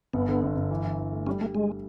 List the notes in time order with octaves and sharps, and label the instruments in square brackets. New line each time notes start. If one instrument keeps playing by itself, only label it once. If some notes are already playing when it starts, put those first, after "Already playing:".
[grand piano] G1 [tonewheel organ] B3
[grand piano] D3
G1
G1
E3
E3
E3
A3
[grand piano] G3 [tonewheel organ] C#4
[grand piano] G3 [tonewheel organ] A3
[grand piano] G3 [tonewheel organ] G#3